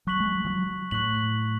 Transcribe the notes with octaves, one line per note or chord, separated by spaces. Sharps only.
F#3 C#6 F#6 B6 F#7
G#3
F#3
E3
F#3
A2 C#6 F#6 B6 F#7